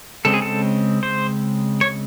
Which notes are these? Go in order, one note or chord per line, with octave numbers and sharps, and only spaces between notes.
C#3 G#3 C4 A4
G#4
A4
C5
C#5